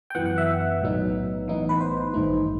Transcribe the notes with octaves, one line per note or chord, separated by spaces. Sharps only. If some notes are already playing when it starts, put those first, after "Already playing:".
G5
F#2 E3 B3 F#5
F#5
E5
B1 A2 F#3 B3 D#4
A2 E3 B3 D#4
B4
C5
A1 G2 D#3 A3 D#4